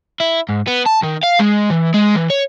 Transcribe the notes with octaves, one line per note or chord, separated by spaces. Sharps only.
E4
G#2
B3
A5
D#3
F5
G#3
E3
G#3
E3
C#5